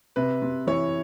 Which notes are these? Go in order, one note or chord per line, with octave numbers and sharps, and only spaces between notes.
C3 B4
C3
E3 C#5